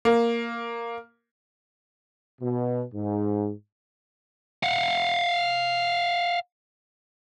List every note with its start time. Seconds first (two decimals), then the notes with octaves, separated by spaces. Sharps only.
0.05 A#3
2.41 B2
2.94 G#2
4.63 F5 F#5